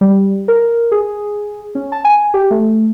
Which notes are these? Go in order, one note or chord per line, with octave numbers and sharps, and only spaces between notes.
G3
A#4
G#4
C#4
A5
G#5
G4
A3